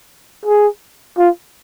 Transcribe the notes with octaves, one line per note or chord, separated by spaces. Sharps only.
G#4
F4